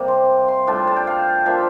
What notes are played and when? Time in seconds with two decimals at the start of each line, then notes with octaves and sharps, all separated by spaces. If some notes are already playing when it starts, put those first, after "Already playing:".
Already playing: C3 G3 A#3
0.08 C6
0.48 C6
0.67 A2 G3 D4 F4 A5
0.87 A5
0.96 G5
1.07 F5
1.46 F3 A#3 D4 F4 E5